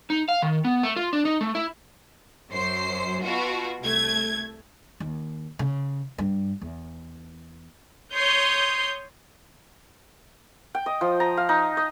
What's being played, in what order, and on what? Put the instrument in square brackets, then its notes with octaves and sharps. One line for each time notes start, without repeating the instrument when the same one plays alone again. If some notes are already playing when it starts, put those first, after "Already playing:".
[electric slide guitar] D#4
F5
D#3
B3
A3
F4
D4
D#4
A3
E4
[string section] F#2 C5 C7
B2 F4 F#4
C2 A3 G#6
[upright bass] D#2
C#3
G2
E2
[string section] C#5 C6 D#6 G6
[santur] G5
D#5
F3
A#5
F5
D#4
D#5